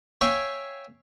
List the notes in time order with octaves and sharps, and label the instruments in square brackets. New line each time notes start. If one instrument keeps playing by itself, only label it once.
[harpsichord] C#5 E5 F5 G5 G#5 C#6